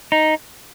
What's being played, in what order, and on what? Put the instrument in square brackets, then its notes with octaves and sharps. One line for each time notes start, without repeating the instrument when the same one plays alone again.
[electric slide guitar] D#4